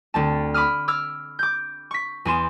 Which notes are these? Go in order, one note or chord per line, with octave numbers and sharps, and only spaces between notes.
D2 C4 A5
B5 D6 D#6 F6
D6 E6 F6 G#6
D6 G6
C#6 B6
E2 G#4 C6 E7